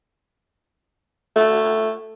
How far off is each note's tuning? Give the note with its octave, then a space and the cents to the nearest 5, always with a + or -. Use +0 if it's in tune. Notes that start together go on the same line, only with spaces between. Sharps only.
A3 +5